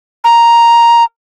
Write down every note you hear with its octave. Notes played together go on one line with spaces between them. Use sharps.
A#5